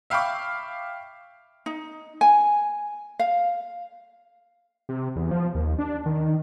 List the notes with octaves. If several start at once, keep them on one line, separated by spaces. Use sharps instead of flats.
E5 F5 G5 B5 C#6 D6
D#4
G#5
F5
C3
E2
F3
D#2
D4
D#3